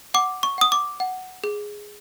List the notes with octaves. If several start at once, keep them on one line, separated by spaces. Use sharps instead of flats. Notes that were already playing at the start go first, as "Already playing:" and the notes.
F#5 D6
C#6
F#5 D#6
D6
F#5
G#4